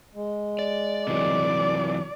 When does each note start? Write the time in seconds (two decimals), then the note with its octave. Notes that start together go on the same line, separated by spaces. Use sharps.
0.15 G#3
0.59 D5
1.07 C3 E3 F#3 D5